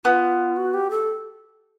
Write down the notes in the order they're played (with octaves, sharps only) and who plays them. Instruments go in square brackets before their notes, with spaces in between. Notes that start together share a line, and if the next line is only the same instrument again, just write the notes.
[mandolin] B3 [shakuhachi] F4
[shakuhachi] F#4
G4
A4